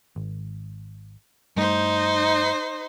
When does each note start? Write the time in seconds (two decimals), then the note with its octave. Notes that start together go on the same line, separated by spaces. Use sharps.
0.16 G#1
1.56 G2 G3 A3 D#4 C5